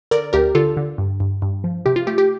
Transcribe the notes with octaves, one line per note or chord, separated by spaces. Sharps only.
D3 A#4 D5
D2 G4 A#4
D3 F4 A4
D3
G2
G2
G2
F3
C3 G4
F4
A3 G4
G4